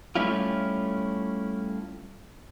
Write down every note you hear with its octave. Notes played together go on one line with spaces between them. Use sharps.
G3 A3 C#4 E4 F4